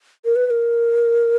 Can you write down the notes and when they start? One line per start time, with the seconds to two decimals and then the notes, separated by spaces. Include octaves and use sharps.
0.25 A#4
0.36 B4
0.46 B4
0.50 A#4